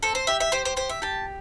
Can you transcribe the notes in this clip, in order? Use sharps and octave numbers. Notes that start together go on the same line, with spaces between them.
C4 A4
C5
G4 E5
E5
G4 C5
C5
G4 C5
E5
G4 A5